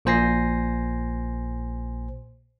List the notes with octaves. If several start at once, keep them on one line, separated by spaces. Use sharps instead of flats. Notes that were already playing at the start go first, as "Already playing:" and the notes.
A#1 A#2 C5 G#5 A#6 C7